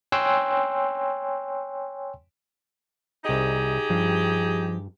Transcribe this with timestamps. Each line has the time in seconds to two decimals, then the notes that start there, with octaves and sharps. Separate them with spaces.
0.12 C#5 G5 G#5 C6 E6 F#6
3.25 C2 D#4 G4 G#4 D#5
3.90 G2 F3